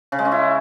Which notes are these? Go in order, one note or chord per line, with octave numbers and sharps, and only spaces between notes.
C#3
G#3
C#4
E4